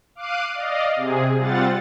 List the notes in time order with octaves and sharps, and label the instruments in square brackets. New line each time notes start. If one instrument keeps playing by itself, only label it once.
[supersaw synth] F5 D6 F#6 C7 D#7
D5 D#5 F5
C3 G#4
G3 C4 F4 F#5 A6